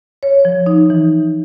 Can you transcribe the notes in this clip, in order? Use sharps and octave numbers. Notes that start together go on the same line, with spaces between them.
C#5
F3
D#4
E3